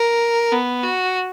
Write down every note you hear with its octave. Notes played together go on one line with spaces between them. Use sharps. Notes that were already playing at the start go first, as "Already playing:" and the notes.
Already playing: A#4
B3
F#4